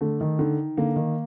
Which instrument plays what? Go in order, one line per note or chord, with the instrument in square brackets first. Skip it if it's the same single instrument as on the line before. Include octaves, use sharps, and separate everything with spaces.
[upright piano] D3 [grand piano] A3
[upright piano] D#3
[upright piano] D3 [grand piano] D#3
[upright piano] D3 [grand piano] A#3
[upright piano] D#3